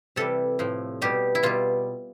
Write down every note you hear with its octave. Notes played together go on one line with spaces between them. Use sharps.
C3 E3 G3 A4
A2 F3
B2 G3 G4
E4
B2 G3 F4